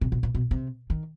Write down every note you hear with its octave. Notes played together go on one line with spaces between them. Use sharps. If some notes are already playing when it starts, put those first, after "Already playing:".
C3
B2
A#2
B2
C3
D#3